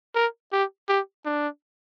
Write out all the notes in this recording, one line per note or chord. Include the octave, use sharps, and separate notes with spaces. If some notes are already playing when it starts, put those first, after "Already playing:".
A#4
G4
G4
D4